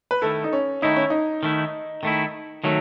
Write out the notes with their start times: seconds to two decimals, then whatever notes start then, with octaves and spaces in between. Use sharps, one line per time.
0.11 B4
0.22 D#3 A3 E4 A4
0.44 D#4
0.53 C#4
0.82 D#3 A3 D#4 E4
0.96 C#4
1.10 D#4
1.43 D#3 A3 E4
2.03 D#3 A3 E4
2.64 D#3 F#3 A3